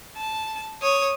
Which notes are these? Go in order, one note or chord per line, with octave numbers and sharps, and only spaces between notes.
A5
C#5 D#6